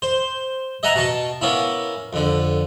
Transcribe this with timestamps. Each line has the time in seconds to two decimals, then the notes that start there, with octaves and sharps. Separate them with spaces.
0.02 C5
0.83 D#5 E5 F#5 G#5 A#5
0.96 B2 A5 C#6
1.41 A#3 B3 C#4 E4
2.13 F2 D3